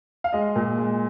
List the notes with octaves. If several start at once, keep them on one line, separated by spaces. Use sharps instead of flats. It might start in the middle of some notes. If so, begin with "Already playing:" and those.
F5
G#3 D#5
A#2
G#3